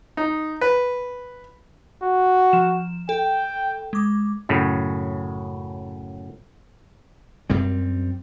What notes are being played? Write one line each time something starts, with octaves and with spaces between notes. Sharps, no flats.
D#4
B4
F#4
F3 E7
A4 G5
G#3 D6
F#2 A2 C#3
F#2 G3 C4